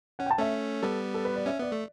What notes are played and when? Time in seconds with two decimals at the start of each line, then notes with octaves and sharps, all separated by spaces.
0.19 C#4 F#5
0.26 G5
0.31 A5
0.38 A3 C#4 E5
0.82 G3 B3 A4
1.14 A4
1.25 B4
1.36 D5
1.46 C#4 E5
1.59 B3 D5
1.72 A3